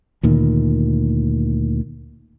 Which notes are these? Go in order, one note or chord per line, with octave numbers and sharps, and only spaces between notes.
D2 A#2 D#3